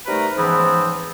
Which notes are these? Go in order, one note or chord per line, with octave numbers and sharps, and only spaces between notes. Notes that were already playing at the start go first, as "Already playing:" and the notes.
C3 G3 A3 D#4 A#4 B4
G#2 C#3 E3 F3 B3 C4